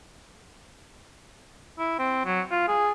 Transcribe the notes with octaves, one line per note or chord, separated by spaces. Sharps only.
E4
C4
F#3
F4
G#4